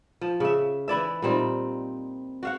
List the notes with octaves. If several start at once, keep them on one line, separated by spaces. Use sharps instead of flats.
F3
C#3 E5
E3 E4 D5 E5
A#2 G3 C4 D#4
F#4 F5 F#5